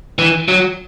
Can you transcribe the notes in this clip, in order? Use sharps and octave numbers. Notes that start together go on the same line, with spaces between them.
E3
F#3